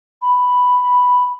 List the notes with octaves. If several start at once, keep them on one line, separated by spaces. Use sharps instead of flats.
B5